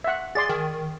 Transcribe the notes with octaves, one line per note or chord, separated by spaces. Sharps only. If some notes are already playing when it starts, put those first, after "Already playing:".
E5 F#5
G#4 D5 C6 A6
D#3 G#4